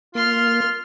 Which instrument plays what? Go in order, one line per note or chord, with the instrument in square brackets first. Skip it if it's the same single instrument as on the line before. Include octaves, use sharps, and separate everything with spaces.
[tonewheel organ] A#3 [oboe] F4 [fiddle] C6 F6